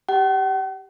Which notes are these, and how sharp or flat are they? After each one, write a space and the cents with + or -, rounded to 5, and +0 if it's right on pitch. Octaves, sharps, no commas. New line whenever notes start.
G4 +0 F#5 +45